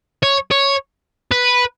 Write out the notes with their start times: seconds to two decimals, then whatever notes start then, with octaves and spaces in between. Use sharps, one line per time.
0.23 C#5
0.51 C#5
1.31 B4